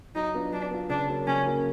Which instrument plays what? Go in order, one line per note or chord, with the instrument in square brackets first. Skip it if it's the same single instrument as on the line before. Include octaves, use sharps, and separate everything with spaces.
[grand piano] F#3 [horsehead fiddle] D#4
[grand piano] B3 D4 F4
[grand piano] F#3 [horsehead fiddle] D4
[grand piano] B3 D4 F4
[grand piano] C#3 [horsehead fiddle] D4
[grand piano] F#3 A#3 C#4
[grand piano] C#3 [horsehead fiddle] C#4
[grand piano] F#3 A#3 C#4